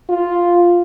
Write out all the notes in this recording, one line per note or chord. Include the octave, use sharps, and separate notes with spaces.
F4